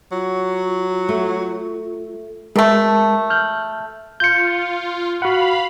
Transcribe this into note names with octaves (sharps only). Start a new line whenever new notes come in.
F#3 F4
A3
B2 G#3 A3 A#4 A5
F6 G6
F4 G6 C#7
F#4 F5 F#5 B5